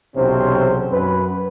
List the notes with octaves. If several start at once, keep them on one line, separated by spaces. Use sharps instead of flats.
B1 E2 C3 C4 C#4 C5
F#2 B4